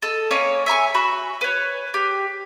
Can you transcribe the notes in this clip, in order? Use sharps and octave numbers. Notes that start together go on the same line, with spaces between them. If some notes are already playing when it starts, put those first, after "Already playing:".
A4 D#5
A#3 C#4 C#5 D#5
E5 G#5 A#5 C#6
F#4 B5
B4 C#5
G4